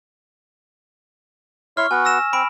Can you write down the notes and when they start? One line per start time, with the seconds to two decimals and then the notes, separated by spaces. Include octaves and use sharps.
1.77 E4 C#5 C6 C#6 F6
1.91 B3 F#4 G#5
2.05 E6 A#6 E7
2.33 C4 B5 D7